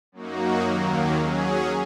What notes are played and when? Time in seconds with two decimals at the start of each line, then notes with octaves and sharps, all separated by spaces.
0.12 F#2 F#3 A#3 D#4 F#4
0.63 D#2 D#3 F#3 A#3
1.15 F#3 C#4 G#4